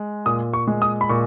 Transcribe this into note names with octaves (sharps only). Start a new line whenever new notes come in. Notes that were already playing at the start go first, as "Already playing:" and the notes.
Already playing: G#3
A#2 D#6
C#6
G#3
D#6
B5
A#2 C#6